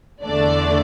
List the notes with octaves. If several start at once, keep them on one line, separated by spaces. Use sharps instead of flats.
E2 D3 A3 D4 D5